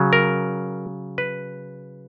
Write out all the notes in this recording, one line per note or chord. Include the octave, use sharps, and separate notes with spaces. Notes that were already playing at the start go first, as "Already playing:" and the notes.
Already playing: C#3 F#3
A#4
B4